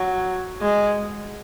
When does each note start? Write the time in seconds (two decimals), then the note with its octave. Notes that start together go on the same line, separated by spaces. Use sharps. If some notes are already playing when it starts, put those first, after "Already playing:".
Already playing: F#3
0.61 G#3